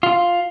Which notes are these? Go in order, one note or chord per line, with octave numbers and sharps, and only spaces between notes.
F4